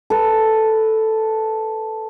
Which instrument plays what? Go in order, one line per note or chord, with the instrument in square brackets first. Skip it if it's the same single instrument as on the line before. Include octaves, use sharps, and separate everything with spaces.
[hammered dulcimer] A4 B4